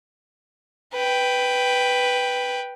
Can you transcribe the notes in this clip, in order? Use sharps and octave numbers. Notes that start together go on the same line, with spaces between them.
B4 G5